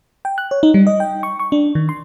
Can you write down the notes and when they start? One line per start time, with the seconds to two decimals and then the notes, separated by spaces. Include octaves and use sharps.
0.25 G5
0.38 F#6
0.51 C#5
0.63 D#4
0.74 G3
0.87 D#5
1.00 G5
1.23 C#6
1.39 C#6
1.52 D4
1.75 D#3
1.89 C6